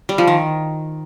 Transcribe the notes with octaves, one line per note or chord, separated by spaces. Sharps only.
G3
F3
D#3